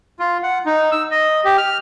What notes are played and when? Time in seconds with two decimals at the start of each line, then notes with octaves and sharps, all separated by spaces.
0.19 F4
0.43 F#5
0.66 D#4
0.92 E6
1.11 D#5
1.45 G4
1.58 F6